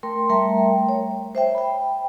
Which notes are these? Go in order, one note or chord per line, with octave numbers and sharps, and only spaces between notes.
A3 A#4 G5 C6
G3 A3 A#4 E5 G5 A#5
C#5
C5 E5 G5
G5 B5